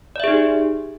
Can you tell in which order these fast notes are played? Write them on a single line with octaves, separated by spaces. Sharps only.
D5 E5 G#4 D#4 G4